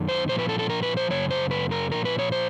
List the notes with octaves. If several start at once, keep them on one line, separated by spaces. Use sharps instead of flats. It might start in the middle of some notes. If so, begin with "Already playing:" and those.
Already playing: F#2 D#3
C5
A#2 F3 C5
B4
A4
A4
A#4
B4
C5
F#2 C#3 C#5
C5
B4
A#4
A#2 F3 A#4
B4
C#5
C5